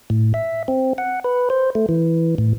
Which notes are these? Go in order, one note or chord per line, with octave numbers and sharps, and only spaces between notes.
A2
E5
C4
F#5
B4
C5
A3
E3
A2